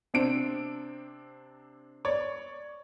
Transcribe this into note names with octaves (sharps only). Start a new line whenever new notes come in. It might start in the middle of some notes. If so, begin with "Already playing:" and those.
C3 C4 D4 D7
C#5 D5